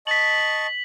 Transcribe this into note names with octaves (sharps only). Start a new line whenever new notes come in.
D#5 A5 C#6 B6 F#7